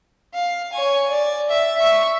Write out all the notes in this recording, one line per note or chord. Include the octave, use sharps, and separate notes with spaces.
F5
C#5 G#5
D5
E5
E5 C#6